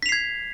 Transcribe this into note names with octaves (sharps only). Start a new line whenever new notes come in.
G#6 B6 C7 F7